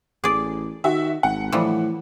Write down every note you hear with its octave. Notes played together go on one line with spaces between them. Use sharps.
A1 G#4 D5
D#3 F#4 E5
G#1 F#5
A2 E3 F3 G3